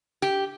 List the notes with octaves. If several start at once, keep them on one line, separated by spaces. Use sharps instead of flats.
G4